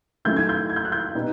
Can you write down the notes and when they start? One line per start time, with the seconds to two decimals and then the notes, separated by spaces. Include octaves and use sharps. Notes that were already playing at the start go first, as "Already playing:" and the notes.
0.25 D#3 F#3 A3 C#4 E4 G6
0.36 G#6
0.49 G6
0.69 G#6
0.76 G6
0.85 F#6
0.92 G6
1.15 B2 G3 B3 D#4